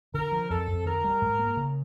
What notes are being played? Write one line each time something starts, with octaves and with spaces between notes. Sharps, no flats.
D3 A#4
F3
F2 A4
F2
D#3 A#4
G3
G#2
A#3
C#3